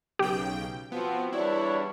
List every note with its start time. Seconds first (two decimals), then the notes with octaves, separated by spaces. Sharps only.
0.19 B1 C#3 G4 G5
0.92 F3 B3 C4 F#4
1.33 E2 G3 D4 E4 C#5